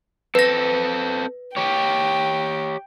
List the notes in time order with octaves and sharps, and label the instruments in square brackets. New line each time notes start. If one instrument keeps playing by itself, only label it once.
[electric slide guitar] C4 A4 [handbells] B4 A#6
[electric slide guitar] G4 C#5 [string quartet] G5